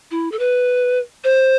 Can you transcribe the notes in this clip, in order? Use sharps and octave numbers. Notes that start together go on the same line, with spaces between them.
E4
A4
B4
C5